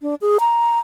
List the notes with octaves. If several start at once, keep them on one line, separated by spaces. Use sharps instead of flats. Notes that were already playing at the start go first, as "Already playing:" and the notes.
D4
G#4
A#5